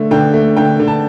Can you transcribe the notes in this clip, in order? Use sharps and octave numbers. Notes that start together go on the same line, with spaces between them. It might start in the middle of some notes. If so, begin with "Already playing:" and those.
Already playing: D3 A3
D3 G5
A3
D3 G5
D3
A5